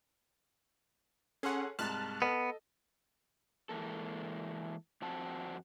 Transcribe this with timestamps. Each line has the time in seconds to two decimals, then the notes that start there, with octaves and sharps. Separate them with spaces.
1.43 C#4 G#4 A4 F#5 C6
1.79 C2 G#2 A5 F6 F#6
2.22 B3 A4 D#5
3.69 E3 G#3 A#3 A4
5.02 F2 C4 F#4 A5